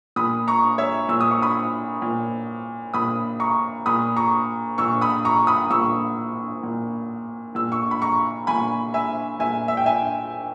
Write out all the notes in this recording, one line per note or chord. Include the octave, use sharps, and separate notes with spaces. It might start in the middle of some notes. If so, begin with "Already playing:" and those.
A#2 B5 D#6
A#5 C#6
C#5 E5
A#2 E6
D#6
C#6
B5 D#6
A#2
A#2 B5 D#6
A#5 C#6
A#2 B5 D#6
A#5 C#6
A#2 C#6 E6
B5 D#6
A#5 C#6
B5 D#6
A#2 C#6 E6
A#2
A#2 E6
C#6 E6
B5
A#5 C#6
A#2 G#5 B5
E5 G#5
A#2 E5 G#5
E5
G5
E5 G#5